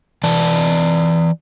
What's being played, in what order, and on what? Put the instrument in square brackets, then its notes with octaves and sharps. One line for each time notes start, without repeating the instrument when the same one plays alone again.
[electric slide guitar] E3 D5 A5